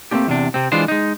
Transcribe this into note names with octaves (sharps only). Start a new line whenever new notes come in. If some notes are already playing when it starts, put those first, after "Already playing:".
A3 A#3 C4 D4 G4
E2 C3 D4
C3 C4
E3 G#3 D4 F4 C5
G#3 D#4